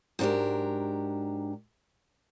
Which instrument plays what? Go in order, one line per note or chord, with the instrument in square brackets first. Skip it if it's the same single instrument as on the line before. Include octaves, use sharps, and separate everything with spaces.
[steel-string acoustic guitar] G#2 F#3 D4 G4 A#4